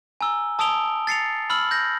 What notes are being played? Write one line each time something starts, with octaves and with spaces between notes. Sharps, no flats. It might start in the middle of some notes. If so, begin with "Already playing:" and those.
G#5 A#5 E6 G7
A5 D#6 E6 D7 F7 G7
A6 C7 C#7 F7
B5 E6 F6 F#7
G6 A#6